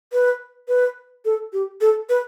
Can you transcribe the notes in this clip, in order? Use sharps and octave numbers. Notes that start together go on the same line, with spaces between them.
B4
B4
A4
G4
A4
B4